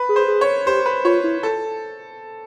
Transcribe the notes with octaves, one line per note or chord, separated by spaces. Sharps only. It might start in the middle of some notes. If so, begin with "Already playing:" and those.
Already playing: B4
G#4
C5
G#4
C#5
G4 C5
B4
F4 C#5
E4
A4